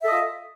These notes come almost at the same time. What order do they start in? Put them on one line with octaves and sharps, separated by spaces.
E5 A4 D#5 F4